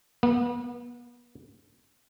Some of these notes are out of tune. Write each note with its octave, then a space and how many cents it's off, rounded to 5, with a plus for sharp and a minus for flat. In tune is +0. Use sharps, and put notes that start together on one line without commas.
B3 -35